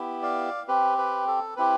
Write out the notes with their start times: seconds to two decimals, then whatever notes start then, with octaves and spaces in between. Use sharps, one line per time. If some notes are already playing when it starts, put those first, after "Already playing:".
Already playing: B3 E4 G4
0.22 D5 F5
0.68 C4 G4 B4
0.98 B4
1.27 A4
1.56 C4 E4 G4 B4